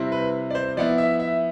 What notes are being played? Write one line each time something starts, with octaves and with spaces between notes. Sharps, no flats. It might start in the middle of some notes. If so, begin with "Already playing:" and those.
Already playing: C3 G3 C4 E4
B4
D5
C5
F3 B3 E4 D5
E5
E5